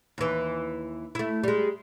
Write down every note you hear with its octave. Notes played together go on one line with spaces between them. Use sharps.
D#2 E3
A3 E4
G3 G#3